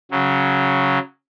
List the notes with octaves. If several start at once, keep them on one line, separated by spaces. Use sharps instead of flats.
C#3 F#3